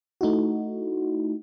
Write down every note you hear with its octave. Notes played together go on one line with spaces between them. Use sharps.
A3 D#4 E4 F#4